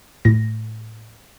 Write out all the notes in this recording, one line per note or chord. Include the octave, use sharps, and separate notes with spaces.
A2 A#6